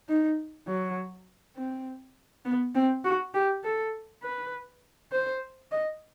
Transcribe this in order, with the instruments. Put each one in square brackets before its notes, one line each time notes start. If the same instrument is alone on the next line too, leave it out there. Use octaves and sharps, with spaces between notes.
[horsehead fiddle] D#4
F#3
C4
B3
C4
F#4
G4
A4
B4
C5
D#5